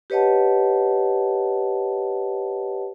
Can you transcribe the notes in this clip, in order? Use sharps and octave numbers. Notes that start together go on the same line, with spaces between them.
G4 B4 C#5 D#5 F#5 A5